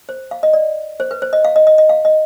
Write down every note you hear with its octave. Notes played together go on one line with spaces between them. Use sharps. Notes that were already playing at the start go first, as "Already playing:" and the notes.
C5
F5
D#5
D5
C5
B4
C5
D#5
F5
D#5
D#5
D#5
F5
D#5